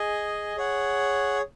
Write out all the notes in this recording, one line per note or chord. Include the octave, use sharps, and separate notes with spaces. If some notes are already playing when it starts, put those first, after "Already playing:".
Already playing: G#4 D#5 G#5
G#4 C#5 F#5